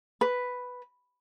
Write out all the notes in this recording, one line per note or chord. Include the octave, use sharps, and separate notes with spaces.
B4